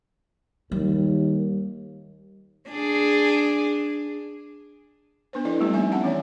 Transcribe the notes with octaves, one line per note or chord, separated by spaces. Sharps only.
D#2 G3
D4 G#4
B3 D4 B4 C5
F3 D4 E4 A4 D5 D#5
G3 A3 A#3 C4 E4 G4
B3 D#4 E5 G#5
C#4 E5 F#5 A5
E3 B3 C#5 D5